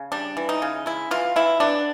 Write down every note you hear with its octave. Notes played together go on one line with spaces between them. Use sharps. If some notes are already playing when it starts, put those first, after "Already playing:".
Already playing: C#3
G3 D4
E3
D#4
C#3
G#3 E4
E3 F4
E3 E4
B3 D4